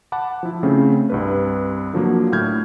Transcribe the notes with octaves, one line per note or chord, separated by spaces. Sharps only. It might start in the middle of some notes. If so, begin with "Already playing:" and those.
F#5 A5 B5 D6
F3 E4
C#3 A3 C4 C#4
C2 G2 B4
D3 F3 F#3 A#3
A2 D3 F6 G6 G#6